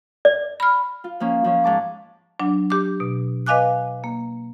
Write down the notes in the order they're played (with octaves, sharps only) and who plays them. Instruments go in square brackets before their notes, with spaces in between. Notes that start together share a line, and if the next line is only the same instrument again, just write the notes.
[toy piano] D5
[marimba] B5 F6
[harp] F4
F3 A#3 C#4
F3 C#4
G#2 A5 D6
[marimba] F#3 D4
G4 D6
B2
B4 D#5 F5 G#5 D6 F#6
A#3